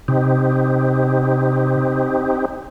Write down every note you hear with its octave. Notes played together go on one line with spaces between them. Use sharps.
C3 C4 D#4 G4